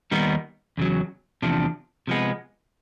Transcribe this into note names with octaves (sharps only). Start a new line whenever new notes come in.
D#2 D#3 G3 B3 D#4
E2 C#3 F#3
E2 C3 F3 A3 D4
C3 F3 G#3 B3